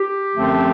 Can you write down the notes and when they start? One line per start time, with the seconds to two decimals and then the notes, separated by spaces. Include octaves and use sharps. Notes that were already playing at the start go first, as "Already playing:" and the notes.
Already playing: G4
0.34 F#2 D3 F3 A3 C4